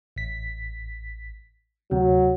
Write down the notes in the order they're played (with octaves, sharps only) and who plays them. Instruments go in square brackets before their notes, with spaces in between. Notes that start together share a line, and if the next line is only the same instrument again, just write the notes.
[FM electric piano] A1 B6
[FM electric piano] D2 C3 [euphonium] F#3